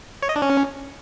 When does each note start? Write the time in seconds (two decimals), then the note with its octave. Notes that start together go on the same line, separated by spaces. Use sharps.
0.23 C#5
0.29 D#5
0.36 D4
0.42 C#4